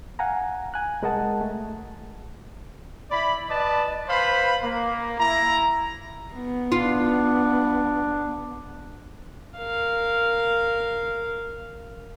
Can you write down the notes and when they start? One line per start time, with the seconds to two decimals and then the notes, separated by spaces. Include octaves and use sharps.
0.19 F5 F#5 G#5 A#5
0.74 G#5 F#6
1.02 C2 G#3 A#4 D#5 F#5 A5
1.41 A3
3.11 E4 D5 B5
3.48 B4 D5 D#5 A5
4.08 B4 C5 F5 B5
4.62 A#3
5.18 E4 A#5
6.34 B3
6.72 D4 F4
9.57 A#4 F5